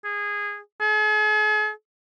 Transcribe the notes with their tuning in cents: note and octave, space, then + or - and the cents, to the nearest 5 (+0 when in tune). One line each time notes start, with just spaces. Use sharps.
G#4 -15
G#4 +45